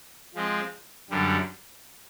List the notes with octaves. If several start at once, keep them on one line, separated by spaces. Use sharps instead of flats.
F3 G#3 C4
F#2 D3 G3